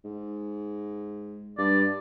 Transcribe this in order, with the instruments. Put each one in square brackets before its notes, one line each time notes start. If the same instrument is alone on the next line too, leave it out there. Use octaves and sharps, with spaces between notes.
[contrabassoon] G#2
[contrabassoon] G2 [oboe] D5